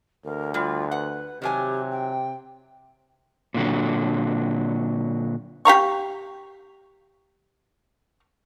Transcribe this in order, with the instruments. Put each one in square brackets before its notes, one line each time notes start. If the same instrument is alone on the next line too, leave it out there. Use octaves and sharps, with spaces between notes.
[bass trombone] D2 [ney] A#4
[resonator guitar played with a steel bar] G3 [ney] F4
[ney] B4 [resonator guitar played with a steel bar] F#5
[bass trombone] C3 [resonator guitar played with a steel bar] D#3 F#3 G#5 [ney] G4
[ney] G5
[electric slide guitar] A#2 D3 F#3
[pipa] G4 F5 A#5 C#6